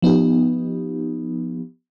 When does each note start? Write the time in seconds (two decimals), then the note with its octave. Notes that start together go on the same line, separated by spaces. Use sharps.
0.02 F3 B3 D#4 G4